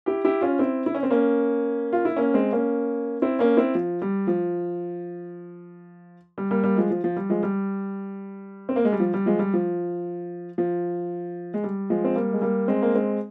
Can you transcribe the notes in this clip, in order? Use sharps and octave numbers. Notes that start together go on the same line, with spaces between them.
E4 G4
E4 G4
C#4 F4
C4 E4
E4
C#4
C4
A#3 C#4
F4
E4
A#3 C#4
G#3 C4
A#3 C#4
C4 E4
A#3 C#4
C4 E4
F3
G3
F3
G3
G3 A#3
G3 A#3
F3 G#3
F3
F3
G3
F3 G#3
G3
C4
A#3
G#3
G3
F3
G3
F3 G#3
G3
F3
F3
G#3
G3
F3 G#3
C4
G3 A#3
G#3
G3 A#3
G#3 C4
A#3
G#3 C4